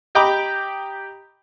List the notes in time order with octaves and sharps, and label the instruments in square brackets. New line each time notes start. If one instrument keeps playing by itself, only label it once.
[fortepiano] G4 D#5 G5 A#5 B5 D6